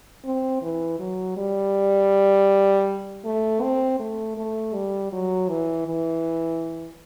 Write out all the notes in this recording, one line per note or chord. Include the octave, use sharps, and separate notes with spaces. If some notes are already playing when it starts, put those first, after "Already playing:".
C4
E3
F#3
G3
A3
C4
A3
A3
G3
F#3
E3
E3